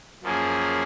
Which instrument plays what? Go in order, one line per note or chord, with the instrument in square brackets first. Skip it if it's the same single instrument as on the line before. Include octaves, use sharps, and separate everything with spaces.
[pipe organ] F#2 F3 A#3 C#4 G#4